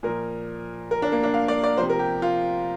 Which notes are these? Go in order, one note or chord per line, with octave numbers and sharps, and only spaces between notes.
A#2 F3 A#4
A#4
D4
A#3
D4
F5
D5
D5
C3 F3 C5
A#4
G4
F4